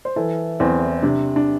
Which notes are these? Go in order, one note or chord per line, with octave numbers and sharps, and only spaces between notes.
C5
E3 A4
E2 C4
C3 D4
D4